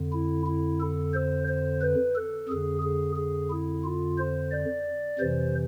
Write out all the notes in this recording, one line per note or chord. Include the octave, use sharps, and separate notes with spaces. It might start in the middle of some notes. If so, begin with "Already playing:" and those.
Already playing: F2 D3
E4
E4
A4
C5
C5
B4
A4
F2 D3 G#4
G#4
G#4
E4
F4
C5
D5
F2 C3 E3 C5